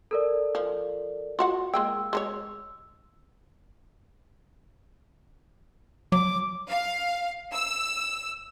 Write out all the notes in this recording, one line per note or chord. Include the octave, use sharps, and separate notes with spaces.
A4 A#4 D5
F3
F4 F#4 F#5
G#3 A#3 G5 E6
G#3 A4 C#5
F#3 D6
F5
E6